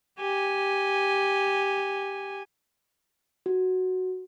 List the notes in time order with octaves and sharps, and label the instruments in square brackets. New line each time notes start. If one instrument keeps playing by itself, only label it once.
[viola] G4 G#5
[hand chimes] F#4